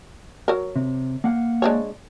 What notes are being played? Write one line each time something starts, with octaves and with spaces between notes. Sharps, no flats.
F#3 A#4
C3
A#3 F5 F#5
G#3 D4 C#5